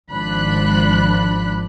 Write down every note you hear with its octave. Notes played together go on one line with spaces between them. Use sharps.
G#1 F3 D4 B5 F#6